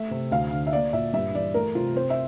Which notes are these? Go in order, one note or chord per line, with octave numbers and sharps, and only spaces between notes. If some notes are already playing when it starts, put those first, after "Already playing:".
Already playing: A3 E5
C3
D2 F5
D3
E5
A#3 D5
A#2 E5
G2 E5
E3 D5
A3 A#4
C3 F4
C4 C5
E5